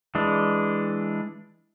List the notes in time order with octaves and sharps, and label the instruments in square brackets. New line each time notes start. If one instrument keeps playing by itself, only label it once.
[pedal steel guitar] E3 G#3 D4